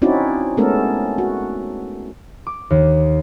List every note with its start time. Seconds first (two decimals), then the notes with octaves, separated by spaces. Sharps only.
0.02 C4 C#4 D#4 E4 F#4 D5
0.57 G#3 A3 B3 C#4 A4 A#4
1.18 F#4
2.47 D6
2.70 D#2